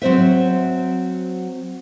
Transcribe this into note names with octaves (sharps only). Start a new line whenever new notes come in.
F#3 C4 C5 E5